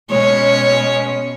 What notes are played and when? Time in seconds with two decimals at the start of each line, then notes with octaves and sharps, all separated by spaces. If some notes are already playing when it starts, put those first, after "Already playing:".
0.11 B2 G#3 C#4 C#5